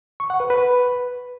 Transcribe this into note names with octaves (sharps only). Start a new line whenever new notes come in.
C#6
F#5
B4
B4